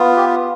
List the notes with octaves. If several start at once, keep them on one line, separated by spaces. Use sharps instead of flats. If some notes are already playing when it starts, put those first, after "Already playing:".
Already playing: B3 F4
G4